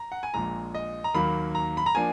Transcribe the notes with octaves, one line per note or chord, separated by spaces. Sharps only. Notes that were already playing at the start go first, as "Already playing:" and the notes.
Already playing: A#5
F#5
G#5
A#1 A#2 G#3 A#5
D#5
A#5
D#2 D#3 F#3 A#3 B5
A#5
B5
A#5
F3 A#3 D4 G#5